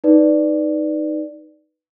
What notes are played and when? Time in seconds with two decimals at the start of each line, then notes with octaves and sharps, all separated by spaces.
0.04 D#4 B4 D5